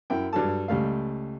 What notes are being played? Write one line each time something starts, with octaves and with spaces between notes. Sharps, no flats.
F#2 E4 G5
G2 F#3 A4 A5
C#2 G3 A3 F5